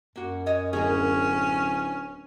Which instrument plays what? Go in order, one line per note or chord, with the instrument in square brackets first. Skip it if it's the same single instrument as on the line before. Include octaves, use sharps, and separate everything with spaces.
[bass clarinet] F#2 [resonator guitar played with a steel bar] A#3 F#4
[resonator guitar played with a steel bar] C#5 D#5
[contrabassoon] D1 [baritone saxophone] C#4 [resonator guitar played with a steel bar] G#4 A#4